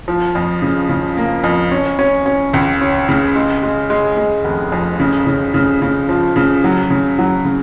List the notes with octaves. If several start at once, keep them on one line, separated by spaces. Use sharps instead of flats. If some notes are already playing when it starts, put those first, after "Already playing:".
F3
F2
C#3
C#3
A#3
F2
C#4
C#4
C#4
C#2
C#4
C#3
G#3
G#3
G#3
G#3
F1
F2
C#3
C#3
C#3
C#3
F3
C#3
F#3
C#3
F#3
C#3